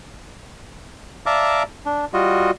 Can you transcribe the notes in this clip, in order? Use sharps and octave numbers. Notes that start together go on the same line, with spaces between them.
D5 E5 F5 A5 A#5 D6
D4
G3 F4 F#4 D#5